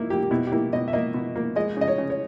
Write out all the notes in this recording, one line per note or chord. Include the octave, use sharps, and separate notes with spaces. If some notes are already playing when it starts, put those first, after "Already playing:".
Already playing: A#3 D#4 E4
A#3 G4
G4
B2 E4
G4
A#3 E4
B2 D#5
E5
A#3 D#5
B2
A#3
G#3 D#5
C#3 D#5
C#5
C#3
C#5